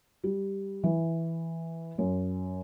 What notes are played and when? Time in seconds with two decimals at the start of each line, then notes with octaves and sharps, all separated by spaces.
0.24 G3
0.84 E3
1.98 F#2